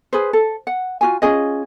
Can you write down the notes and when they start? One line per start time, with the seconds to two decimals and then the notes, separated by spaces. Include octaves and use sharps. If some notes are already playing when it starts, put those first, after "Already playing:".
0.13 G#4 B4 C5
0.33 A4
0.67 F#5
1.01 F4 F#4 G#5
1.22 C#4 F4 G#4 D#5